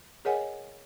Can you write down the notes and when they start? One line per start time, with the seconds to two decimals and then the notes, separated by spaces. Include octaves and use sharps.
0.25 G#4 A#4 C#5 D#5 F#5 G#5